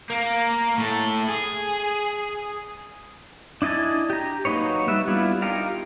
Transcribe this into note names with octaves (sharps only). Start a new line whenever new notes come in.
A#3
A2 A4
G#4
D4 E4 D#5 G#5 A5
G4 A#5
F#3 A#3 D#4 B4 C#5
G3 B4 E5
G3 B3 D4 E4 F4
D#4 F4 G4 A#4 F5